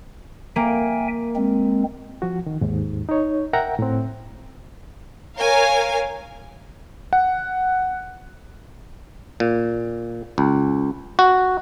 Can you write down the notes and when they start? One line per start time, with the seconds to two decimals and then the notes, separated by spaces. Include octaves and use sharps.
0.56 A#3 E5 G5 G#5
1.36 G#3 C4
2.22 F3 F#4
2.46 D#3
2.61 D#2 G#2
3.09 D#4 C#5
3.53 A#4 E5 F#5 G5 A#5
3.79 A2 C4
5.38 A#4 C#5 F5 G#5
7.13 F#5
9.40 A#2
10.38 C#2
11.19 F#4